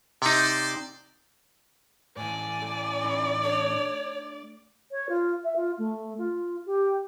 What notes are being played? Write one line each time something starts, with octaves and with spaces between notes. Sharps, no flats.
C3 D#4 C5 D5
A2 E3 D5 G#5
A3
D3 D#4 E4
A3 D4 D#4 C#5
C#5
F4
E5
F4
A3
F4
G4